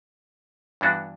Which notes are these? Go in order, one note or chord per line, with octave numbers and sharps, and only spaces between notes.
G2 E3 B3 D4 F#4